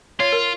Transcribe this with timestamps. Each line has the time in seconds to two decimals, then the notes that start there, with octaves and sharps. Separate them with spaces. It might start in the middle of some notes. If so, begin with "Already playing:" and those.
0.20 F4 C#5
0.32 A#4